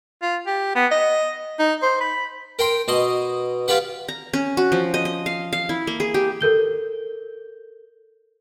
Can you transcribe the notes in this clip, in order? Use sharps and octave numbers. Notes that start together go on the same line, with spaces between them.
F4
G4
B3
D#5
D#4
C5
B5
A#4 G5 C6
B2 D#5 C6
F4 G4 B4 F#5
A#5
C#4
F#4
F3
D#5
D#5
F5
F5
E4
A#3
G#4
G4
A4 A#4 G6 G7